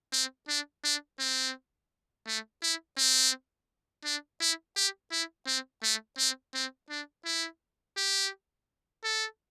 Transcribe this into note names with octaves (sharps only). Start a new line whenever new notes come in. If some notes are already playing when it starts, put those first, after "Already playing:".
C4
D4
D4
C4
A3
E4
C4
D4
E4
G4
E4
C4
A3
C4
C4
D4
E4
G4
A4